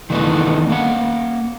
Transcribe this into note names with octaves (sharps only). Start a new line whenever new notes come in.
D#3 E3 A3 B3 D4 D#4
A#3 F#5